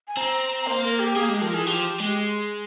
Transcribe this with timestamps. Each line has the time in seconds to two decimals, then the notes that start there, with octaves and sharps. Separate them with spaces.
0.08 G#5
0.17 C4 A#5
0.67 A#3 C5
0.84 A#4
0.99 G4
1.16 A#3 G#4
1.29 G#3 G4
1.41 F3 A#4
1.54 E3 G#4
1.66 F3 G4
2.00 G#3